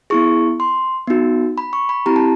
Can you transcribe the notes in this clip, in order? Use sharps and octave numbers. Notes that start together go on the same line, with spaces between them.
B3 E4 G#4 C#6
C6
B3 D#4 F#4
B5
C#6
B5
C4 E4 G4 A#5
A5